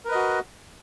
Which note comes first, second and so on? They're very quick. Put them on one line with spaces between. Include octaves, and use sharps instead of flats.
A#4 B4 D#5 F#4